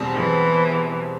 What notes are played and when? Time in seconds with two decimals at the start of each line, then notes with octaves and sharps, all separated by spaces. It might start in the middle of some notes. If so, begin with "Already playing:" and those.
Already playing: E2 B2 G3 C4
0.15 E3